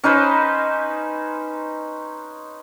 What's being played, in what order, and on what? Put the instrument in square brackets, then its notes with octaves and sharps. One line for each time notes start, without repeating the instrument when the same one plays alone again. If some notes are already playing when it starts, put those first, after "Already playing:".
[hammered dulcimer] C#4 D#4 B4 C5